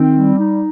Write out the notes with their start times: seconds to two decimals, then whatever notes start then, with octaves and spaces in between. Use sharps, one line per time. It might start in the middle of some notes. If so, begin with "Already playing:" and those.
Already playing: D#3 C4
0.16 G3
0.39 D#4